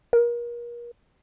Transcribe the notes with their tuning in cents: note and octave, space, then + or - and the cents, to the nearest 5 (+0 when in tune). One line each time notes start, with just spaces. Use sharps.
A#4 +35